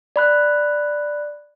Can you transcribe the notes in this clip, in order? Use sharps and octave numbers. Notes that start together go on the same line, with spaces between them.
D5 B5 F#6